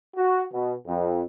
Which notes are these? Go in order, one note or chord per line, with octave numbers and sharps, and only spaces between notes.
F#4
B2
F2